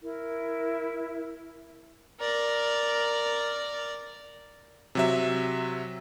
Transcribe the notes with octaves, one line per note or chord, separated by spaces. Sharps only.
E4 A#4
A#4 D5
C3 F#3 E5